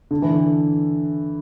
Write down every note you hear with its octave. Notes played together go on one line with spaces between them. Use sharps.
D3
E3
D3